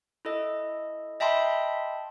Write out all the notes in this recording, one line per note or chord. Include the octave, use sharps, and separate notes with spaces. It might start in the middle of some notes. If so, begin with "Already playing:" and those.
E4 A4 D#5
D#5 E5 G5 A5 B5 C6